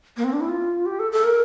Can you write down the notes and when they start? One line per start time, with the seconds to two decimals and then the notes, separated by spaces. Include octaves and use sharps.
0.17 A#3
0.24 C4
0.33 D4
0.40 E4
0.48 F4
0.86 G4
0.99 A4
1.12 A4
1.24 A#4